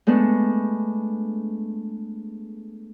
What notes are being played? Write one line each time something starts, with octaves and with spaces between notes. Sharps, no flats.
G#3 A3 B3 D4